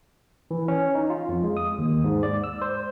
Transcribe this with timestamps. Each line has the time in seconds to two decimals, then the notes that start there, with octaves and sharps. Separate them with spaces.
0.51 E3
0.68 C#4
0.95 D#4
1.10 F4
1.29 F2
1.43 G#3
1.57 D#6
1.78 D#2
2.04 G#2
2.23 D5
2.44 E6
2.62 C5